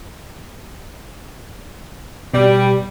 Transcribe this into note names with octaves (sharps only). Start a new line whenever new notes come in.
B2 G3